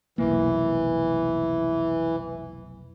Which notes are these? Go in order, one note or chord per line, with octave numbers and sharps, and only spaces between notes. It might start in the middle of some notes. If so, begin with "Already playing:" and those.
F1 B1 E3 A#3